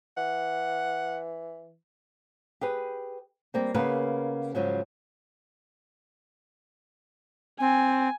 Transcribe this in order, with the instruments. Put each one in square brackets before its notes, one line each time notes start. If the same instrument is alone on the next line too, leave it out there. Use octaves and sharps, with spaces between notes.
[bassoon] E3 [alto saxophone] F#5
[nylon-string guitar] G4 G#4 B4
G3 A#3 C4
C#3 A#3 B3 G#4 A#4 B4
G#2 C#3 F3 F#3
[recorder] C4 [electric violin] G#5